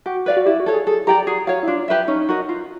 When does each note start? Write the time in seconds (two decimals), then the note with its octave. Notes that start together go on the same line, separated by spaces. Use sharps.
0.06 F#4 G4
0.26 B4 D5 F5
0.37 F#4
0.46 E4 G4
0.60 F#4
0.66 A4 C#5
0.73 G#4
0.87 G#4 A4
1.07 G4 D5 G5 A#5
1.27 F#4 G#4
1.47 F#4 C#5 F5
1.63 E4
1.67 D4 F4
1.88 G4 B4 E5
2.08 C#4 D#4
2.29 F#4 A#4 D#5
2.49 F4